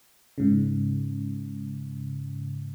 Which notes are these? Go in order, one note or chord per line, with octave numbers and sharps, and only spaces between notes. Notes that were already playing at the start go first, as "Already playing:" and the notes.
G#2 C#3